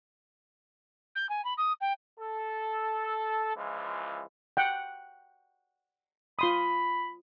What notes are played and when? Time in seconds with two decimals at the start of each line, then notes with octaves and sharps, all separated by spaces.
1.15 G6
1.29 G#5
1.44 B5
1.57 D#6
1.80 G5
2.20 A4
3.57 C#2 E3 F3 G#3
4.57 F#5 G5
6.39 F4 B5 C6 D#6